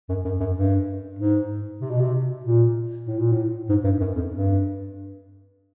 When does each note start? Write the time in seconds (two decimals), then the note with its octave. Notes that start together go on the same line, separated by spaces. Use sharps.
0.09 F#2
0.25 F#2
0.40 F#2
0.56 G2
1.19 G#2
1.81 C3
1.90 B2
2.00 C3
2.44 A#2
3.06 A2
3.19 A#2
3.32 A2
3.69 G#2
3.84 G2
4.00 F#2
4.15 F2
4.31 G2